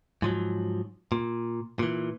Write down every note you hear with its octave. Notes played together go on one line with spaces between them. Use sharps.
G#2 F3 F#3
A#2
A#2 E3